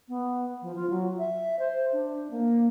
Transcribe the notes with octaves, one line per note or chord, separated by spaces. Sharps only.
B3
F3
F4
F#3
E5
C5
D4
A#3